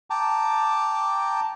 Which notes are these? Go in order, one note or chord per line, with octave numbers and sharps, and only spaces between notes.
G5 A5 A#5 D6